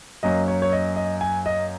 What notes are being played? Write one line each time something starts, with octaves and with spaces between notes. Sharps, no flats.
F#2 F#3 A#3 D#5
C#5
C#5
D#5
D#5
G#5
D#5